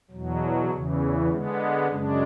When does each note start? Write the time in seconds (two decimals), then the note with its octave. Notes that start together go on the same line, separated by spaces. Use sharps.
0.11 E2 B2 F#3
0.70 E2 C#3 E3
1.29 D3 G#3 B3
1.88 F#2 C#3 G#3 D4